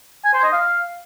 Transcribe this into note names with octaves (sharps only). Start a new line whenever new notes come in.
G#5
C5
D#5
F5